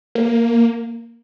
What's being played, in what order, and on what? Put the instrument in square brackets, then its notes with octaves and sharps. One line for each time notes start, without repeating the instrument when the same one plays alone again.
[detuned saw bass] A#3